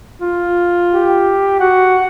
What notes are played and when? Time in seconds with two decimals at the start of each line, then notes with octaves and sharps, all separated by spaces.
0.21 F4
0.94 G4
1.60 F#4 F#5